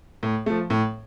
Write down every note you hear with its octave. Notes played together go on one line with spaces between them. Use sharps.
A2
F3 A3
A2